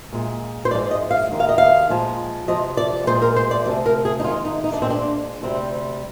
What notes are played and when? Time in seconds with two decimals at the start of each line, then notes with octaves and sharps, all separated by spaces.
0.13 A#2 G#3
0.65 C5
0.71 G#2 F3 G#3 D5
0.91 D#5
1.11 F5
1.31 D#2 D#3 G#3
1.40 F5
1.49 D#5
1.58 F5
1.89 A#2 F3 G#3
2.48 F2 C3 F3 D#5
2.77 D5
3.07 A#2 G#3 C5
3.22 A#4
3.36 C5
3.51 D5
3.65 D2 C3 F3 G#3 D5
3.86 A#4
4.05 G#4
4.19 D#4
4.24 F2 D#3 G#3 F4
4.45 D#4
4.64 D#4
4.73 D4
4.82 A#2 G#3 C4
4.90 D4
5.42 D2 C3 G3 C4